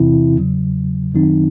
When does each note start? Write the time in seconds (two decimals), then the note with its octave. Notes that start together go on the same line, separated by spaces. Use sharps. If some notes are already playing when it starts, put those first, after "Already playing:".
Already playing: E2 C3 E3 C4 E4
0.36 E2 C#3 F#3
1.14 F#2 D#3 F#3 C4 D#4